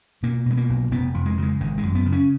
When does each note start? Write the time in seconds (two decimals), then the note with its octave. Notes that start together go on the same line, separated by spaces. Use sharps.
0.23 B2 A#3
0.46 B2 G#3
0.57 A#3
0.69 B1
0.91 F1 B3
1.14 F2
1.26 G#3
1.38 C#3 G#3
1.61 G#1 G#3
1.78 F#2 G#3
1.95 B3
2.06 C#3
2.12 C#4